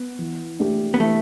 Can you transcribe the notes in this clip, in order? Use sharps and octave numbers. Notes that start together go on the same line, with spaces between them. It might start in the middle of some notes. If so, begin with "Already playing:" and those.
Already playing: B3
E3
A3 D4 G4
B3
E3 A3